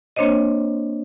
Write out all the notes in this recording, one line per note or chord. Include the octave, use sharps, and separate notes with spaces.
A#3 C4 D4 C5 C#5 D#5